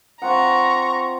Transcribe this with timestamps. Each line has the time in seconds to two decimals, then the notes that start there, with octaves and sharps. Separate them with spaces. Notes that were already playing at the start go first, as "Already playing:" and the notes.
0.22 C4 F4 F#5 A#5 C#6